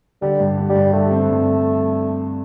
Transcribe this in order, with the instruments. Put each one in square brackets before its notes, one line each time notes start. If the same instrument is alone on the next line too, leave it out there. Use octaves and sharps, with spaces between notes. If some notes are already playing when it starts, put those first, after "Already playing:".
[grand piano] D3 [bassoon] G3
[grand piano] G2
D3
[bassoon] G3
[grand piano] G2
[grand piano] D3 [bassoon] A3
[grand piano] C4
G2